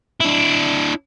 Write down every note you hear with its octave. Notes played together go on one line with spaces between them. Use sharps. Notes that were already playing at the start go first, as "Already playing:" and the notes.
D4 E4